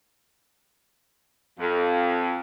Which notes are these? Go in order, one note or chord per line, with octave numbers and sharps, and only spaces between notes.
F2